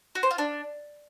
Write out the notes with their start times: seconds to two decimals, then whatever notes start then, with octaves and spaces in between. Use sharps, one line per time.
0.15 F#4
0.23 C5
0.31 F4
0.38 D4